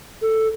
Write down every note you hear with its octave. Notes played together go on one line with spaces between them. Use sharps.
A4